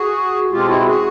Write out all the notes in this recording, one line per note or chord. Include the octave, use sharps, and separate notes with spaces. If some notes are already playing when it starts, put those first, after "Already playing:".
Already playing: F#4 G#4
B2 G#3 C4 F4 G4
E4 F#4
F#4 G#4